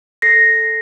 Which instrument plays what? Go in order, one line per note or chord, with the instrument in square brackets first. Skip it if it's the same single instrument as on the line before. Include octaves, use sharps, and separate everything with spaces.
[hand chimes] A4 A#6 C7